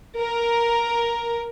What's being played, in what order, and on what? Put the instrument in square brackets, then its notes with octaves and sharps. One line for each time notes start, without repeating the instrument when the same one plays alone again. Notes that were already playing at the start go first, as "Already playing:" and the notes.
[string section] A#4